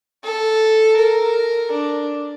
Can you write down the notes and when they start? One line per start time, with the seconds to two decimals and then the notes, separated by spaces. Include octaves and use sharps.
0.24 A4
0.97 A#4
1.71 D4